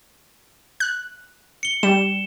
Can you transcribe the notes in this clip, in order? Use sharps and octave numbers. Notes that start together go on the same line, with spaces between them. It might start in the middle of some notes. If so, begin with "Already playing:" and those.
F#6
C#7 G7
G3 E7